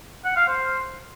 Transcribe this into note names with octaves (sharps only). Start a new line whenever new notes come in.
F#5
F5
C5